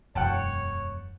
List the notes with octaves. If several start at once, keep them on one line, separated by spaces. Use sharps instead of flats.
E1 F#2 C#5 F#5 G5 A5